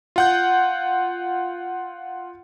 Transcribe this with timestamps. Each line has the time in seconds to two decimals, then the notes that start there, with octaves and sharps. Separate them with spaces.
0.16 F4 F#5 G6